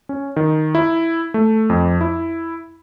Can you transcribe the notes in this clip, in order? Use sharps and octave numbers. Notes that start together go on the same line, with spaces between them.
C#4
D#3
E4
A3
F2
E4